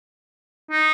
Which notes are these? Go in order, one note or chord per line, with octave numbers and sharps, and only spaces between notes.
D#4